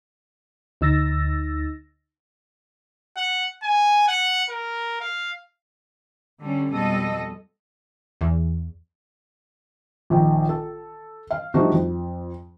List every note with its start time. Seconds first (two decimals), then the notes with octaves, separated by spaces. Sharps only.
0.81 D2 D#4 E6 A6 A#6
3.17 F#5
3.63 G#5
4.08 F#5
4.49 A#4
5.00 F5
6.40 D3 G3 C#4
6.70 F2 B2 G3 G#3 A4 D#5
8.21 E2
10.10 A#1 D#3
10.49 A4
11.31 F5
11.54 F3 G3 A3 D4 D#4 F#4
11.72 F2